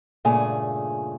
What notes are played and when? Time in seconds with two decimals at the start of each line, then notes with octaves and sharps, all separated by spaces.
0.25 G2 A#2 C#3 A3 G#4 G#5